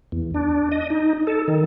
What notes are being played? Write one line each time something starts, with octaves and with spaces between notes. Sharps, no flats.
E2
D4
D#5
D#4
A4
D#3